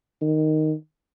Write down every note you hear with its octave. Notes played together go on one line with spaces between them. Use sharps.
D#3